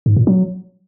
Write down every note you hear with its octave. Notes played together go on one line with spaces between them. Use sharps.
G#2
A#2
F#3